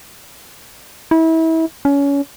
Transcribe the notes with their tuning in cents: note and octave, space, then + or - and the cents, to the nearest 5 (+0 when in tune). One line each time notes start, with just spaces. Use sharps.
E4 -30
C#4 +25